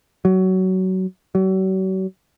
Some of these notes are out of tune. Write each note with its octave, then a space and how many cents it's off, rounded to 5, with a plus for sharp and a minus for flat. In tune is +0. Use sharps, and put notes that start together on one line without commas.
F#3 +20
F#3 +40